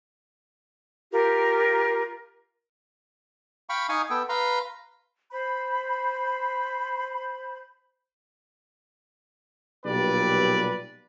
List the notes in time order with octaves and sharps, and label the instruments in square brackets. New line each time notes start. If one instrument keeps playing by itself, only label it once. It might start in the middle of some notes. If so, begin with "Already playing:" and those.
[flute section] F4 G4 A#4
[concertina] F5 G5 B5 C#6
D#4 D#5 F5 G#5 C#6 D#6
B3 A4 G5
B4 F5 A#5 C6
[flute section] C5 B5
[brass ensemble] B1 A#2 G3 G4 B4 D5